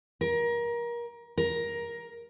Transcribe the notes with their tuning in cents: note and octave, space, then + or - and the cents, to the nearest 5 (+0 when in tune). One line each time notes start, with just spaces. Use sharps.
A#4 +25
A#4 +15